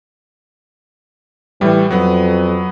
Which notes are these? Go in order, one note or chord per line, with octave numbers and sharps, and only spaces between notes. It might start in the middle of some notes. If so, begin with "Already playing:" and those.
A2 E3 G3
F2 F#3 B3